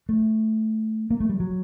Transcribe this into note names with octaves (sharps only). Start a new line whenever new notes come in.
A3
A#3
A3
G3
F#3